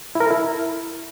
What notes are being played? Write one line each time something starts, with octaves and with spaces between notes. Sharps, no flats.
E4
A#4
A4
E4